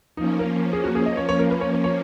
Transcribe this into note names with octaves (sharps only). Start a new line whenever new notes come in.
F3 A#3 C#4 D#4
A#4
G#4
F#4
G#4
D#5
C#5
C#5
A#4
B4
C#5
C#5
C#5